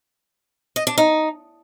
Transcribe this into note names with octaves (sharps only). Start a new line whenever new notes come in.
D#5
D4
D#4